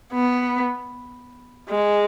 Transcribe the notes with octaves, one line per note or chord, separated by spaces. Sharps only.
B3
G#3